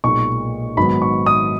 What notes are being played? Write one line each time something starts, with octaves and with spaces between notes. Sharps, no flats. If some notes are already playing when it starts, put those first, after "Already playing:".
B1 A#2 G#3 C#6
G#1 G#2 F#3 B3 B5
C#6
D#6